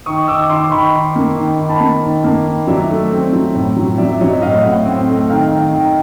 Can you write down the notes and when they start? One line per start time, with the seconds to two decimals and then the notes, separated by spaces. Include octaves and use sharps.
0.06 D#3 C#6 D#6
0.28 D#3 D6 E6
0.50 D#3 C6 D6
0.71 D#3 B5 C#6
0.94 D#3
1.16 A#3
1.37 D#3
1.59 D#3
1.69 A5 B5
1.81 A#3
2.03 D#3
2.24 A#3
2.46 D#3
2.67 F#3 D5 E5
2.90 A3
3.11 C4
3.33 F#3
3.55 A2
3.76 F#3
3.98 F#3 D5 E5
4.21 F#3 C#5 D#5
4.42 A2 D#5 F5
4.64 A2 E5 F#5
4.85 C4
5.08 A3
5.29 D#3 F5 G5
5.51 D#3
5.74 D#3